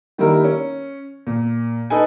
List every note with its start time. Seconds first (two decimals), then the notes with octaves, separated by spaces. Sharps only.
0.18 D#3 G3 A#3 E4 A#4
0.44 C#4
1.27 A#2
1.90 D#4 A4 B4 G#5